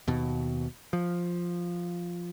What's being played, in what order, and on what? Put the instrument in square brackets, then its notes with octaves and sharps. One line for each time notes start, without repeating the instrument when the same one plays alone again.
[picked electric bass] D#2 B2
F3